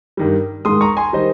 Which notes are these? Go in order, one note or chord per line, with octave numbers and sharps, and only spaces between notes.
G2 D#3 G3
G#2 D#3 G#3 C6 D#6
A#5 C#6
G#5 C6
D#3 G3 C5 D#5